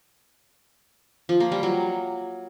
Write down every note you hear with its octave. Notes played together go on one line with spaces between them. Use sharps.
F3
A#3
G3
F#3